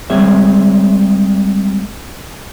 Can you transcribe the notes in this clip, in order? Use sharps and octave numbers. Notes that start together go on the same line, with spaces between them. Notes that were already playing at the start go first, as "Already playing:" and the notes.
G3 G#3 C4 G#4 C#5 E5